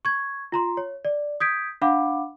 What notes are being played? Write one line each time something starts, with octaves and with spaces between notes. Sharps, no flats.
C#6 G#6
F4 A#5 C6
C#5
D5
D#6 G6 G#6 B6 D7
D4 F5 F#5 B5 D6